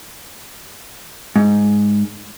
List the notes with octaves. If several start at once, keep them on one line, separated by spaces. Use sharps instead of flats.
G#2